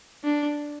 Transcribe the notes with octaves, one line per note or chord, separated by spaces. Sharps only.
D4